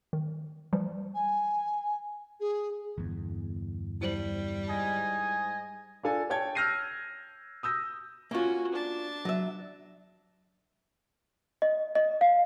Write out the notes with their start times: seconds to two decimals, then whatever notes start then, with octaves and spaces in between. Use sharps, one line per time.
0.13 D#3
0.73 E3 F3 G3
1.14 G#5
2.40 G#4
2.98 G1 E2
4.01 G3 E4 C5 F#7
4.68 G#2 D#5 G#5
6.03 D4 F4 A4 G#5 A5
6.30 C#5 G5 A5 G#6
6.55 E6 F6 G6 A#6 C7 D#7
7.63 D#6 E6 G6 A#6
8.31 A#3 C#4 F4 F#4
8.73 D4 A5
9.25 F#3 E5
11.62 D#5
11.95 D#5
12.21 F5